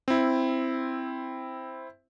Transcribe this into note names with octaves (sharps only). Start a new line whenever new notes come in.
C4 E4